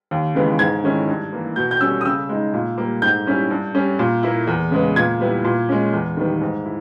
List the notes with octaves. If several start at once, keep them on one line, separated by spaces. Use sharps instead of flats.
D#2
C#3 E3 G#3 B3
G#2 G#6
D#3 G#3 C#4 E4
G2
E3 A#3
B2 G6
G6
G3 C#4 E6
D#6
C#3 E6
G#3 D#4
A#2
G3 A#3
G#2 G6
G3 C#4 E4
G2
G3 C#4
A#2
A#3 E4
E2
C#3 G#3 B3
A#2 G#6
G3 B3 E4
A#2
G#3 C#4
E2
D#3 G3 B3
G#2
E4